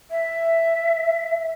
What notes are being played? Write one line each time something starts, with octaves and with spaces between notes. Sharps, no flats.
E5